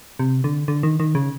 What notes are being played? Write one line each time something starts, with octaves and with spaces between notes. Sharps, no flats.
C3
D3
D3
D#3
D#3
C#3